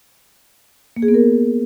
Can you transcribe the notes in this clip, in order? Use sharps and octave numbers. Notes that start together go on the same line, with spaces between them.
A#3
G#4
B3
A#4